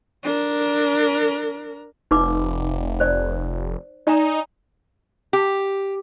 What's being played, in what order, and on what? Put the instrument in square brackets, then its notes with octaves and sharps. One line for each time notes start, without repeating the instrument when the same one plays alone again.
[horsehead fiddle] D4 A#4
[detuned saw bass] F1 [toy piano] D#4 B4 D6
[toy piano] C5 D5
[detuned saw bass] D#4 [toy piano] D5 G#5 A#5
[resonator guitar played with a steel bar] G4